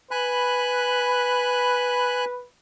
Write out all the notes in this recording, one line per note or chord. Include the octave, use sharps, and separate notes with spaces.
B4 G#5 B5 F#6